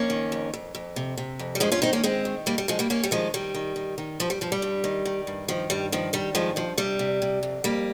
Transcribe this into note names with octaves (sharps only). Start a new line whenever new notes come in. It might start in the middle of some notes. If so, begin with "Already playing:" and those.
Already playing: F2 A#3 C#4
D#3
F2
F2
F2
C3
C3
F2
G3
G2 F3 G#3
C#4 F4
D#3 C4 D#4
A#3 C#4
D#3 G#3 C4
D#3
G2 G3 A#3
G3
G2 F3 G#3
G3 A#3
G2 A#3 C#4
G3
D#3 F3 G#3
D#3 G3
D#3
D#3
D#3
G2 F3
G3
G2 F3
G3
G2
D#3
D#3
G2
D#3 F3
G2 G3
D#3 F3
D#3 G3
G2 F3 G#3
G2 F3
C3 G3
C3
C3
F2
F2 G3 A#3